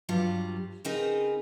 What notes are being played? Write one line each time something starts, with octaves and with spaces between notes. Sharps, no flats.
G2 F#3 G3 F4
C#3 C4 D#4 G#4 A#4 B4